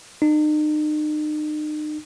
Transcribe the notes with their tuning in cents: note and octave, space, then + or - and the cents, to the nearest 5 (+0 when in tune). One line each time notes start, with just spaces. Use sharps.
D#4 -40